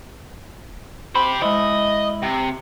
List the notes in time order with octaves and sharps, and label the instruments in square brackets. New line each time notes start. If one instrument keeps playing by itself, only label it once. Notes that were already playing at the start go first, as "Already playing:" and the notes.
[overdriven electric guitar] G4 C5 [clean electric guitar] B5
[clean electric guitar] G#3 E4 [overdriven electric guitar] D#5
[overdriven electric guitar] C3